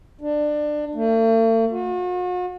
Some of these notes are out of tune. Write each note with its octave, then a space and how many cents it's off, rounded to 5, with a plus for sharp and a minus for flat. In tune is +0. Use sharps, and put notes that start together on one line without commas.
D4 +20
A3 +45
F#4 -45